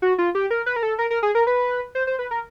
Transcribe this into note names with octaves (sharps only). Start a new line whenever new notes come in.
F#4
F4
G4
A#4
B4
A#4
A4
A#4
A#4
G#4
A#4
B4
C5
C5
B4
A#4